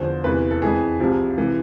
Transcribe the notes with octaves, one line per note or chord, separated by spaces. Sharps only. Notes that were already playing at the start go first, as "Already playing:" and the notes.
Already playing: E2 D3 F3 C5
E2 C3 E3 B4
A4
F2 E3 G#4
C2 C3 F3
C3 E3